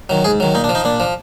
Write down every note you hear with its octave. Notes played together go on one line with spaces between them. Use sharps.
D#3 F#3
G#2 G#4
D#3 F#3
A#2 D#4
D4
F3
D#4
A#2 D4
F3